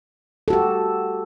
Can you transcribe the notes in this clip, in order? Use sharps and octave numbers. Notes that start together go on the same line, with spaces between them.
F#4 G4 A4